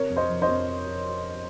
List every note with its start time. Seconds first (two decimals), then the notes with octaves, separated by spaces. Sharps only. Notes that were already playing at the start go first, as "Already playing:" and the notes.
Already playing: C3 A#4 C#5
0.10 F2
0.16 C5 D#5
0.29 F3
0.42 C5 D#5
0.48 F2